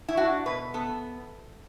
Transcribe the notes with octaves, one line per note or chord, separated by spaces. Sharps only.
E4
D4 F#4
B2 B4
B3 A4